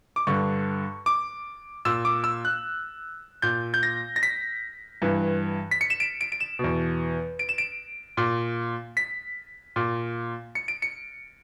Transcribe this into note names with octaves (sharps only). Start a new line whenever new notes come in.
D6
G2 D3 C#6
D6
A#2 E6
D6
E6
F#6
A#2 G6
G6
A#6
A#6
B6
G2 E3
B6
C#7
E7
D7
D7
D7
E7
B2
E2
D7
E7
D7
A#2
B6
A#2
C#7
D7
C#7